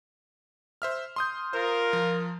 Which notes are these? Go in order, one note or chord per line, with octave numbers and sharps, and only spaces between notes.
C5 E5 F6
C6 D#6 G6
F4 A#4 C5
F3